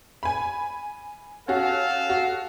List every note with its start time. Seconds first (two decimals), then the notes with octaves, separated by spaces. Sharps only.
0.23 G#5 B5
1.48 C#4 F#4 A4 F5
2.10 F#4